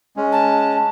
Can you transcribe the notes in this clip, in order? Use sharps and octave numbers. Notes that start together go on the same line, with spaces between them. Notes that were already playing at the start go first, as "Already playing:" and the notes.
G#3 C#4
A5